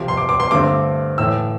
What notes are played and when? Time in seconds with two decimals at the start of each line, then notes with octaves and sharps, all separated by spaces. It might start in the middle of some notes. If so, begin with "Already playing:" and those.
Already playing: C2 C3 F3
0.08 C6
0.17 D6
0.29 D6
0.40 C6
0.51 G2 D3 A3 C4 D6
1.18 A2 E3 A3 E6